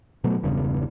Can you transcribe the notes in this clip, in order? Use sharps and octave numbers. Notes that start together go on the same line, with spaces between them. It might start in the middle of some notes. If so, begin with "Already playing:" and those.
B2 F#3 A3
E1 E2 G2 C#3